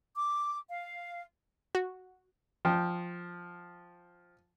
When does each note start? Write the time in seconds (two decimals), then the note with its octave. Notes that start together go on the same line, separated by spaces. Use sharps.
0.17 D6
0.69 F5
1.75 F#4
2.65 F3 G5